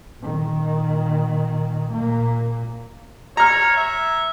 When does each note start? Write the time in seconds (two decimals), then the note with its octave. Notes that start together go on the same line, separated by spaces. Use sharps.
0.19 A#2 D#3
1.93 A#2 A#3
3.37 C#5 A#5 F6
3.76 E5